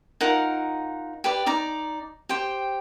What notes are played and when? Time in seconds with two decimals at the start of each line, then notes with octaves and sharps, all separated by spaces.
0.21 D#4 F4 A#4 F#5
1.24 G4 B4 D5
1.46 D#4 D5 A#5
2.29 G4 C5 G5